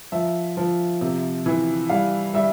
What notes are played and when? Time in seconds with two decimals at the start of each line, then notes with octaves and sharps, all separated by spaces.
0.12 F3 E5
0.57 F3
1.01 C3
1.46 E3
1.90 G3 F5
2.34 G3 E5